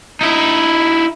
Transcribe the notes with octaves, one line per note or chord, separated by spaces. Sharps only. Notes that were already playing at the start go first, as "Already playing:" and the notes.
D#4 E4